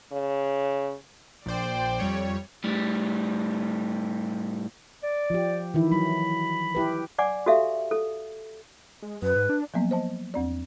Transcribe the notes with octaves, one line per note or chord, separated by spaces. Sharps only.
C#3
A#1 C5 D5 G5
F2 G3 C#5
A2 G3
D5
F3 G4
D#3 E3 E4
F#3 B5
E4 G4 B4
D5 F#5 G#5 D6
F#4 G4 A4 E5 F5
A4
G#3
F#2 B4
G#2
D4
F3 F#3 A#3 B3
C5 D#5 A5
E2 C4 D5